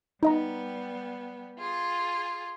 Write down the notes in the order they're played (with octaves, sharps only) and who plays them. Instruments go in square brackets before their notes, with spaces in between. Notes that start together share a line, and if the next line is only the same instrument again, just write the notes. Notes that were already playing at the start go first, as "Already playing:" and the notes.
[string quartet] G3 B3 [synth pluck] D#4 D#5 A#5
[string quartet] F4 G#4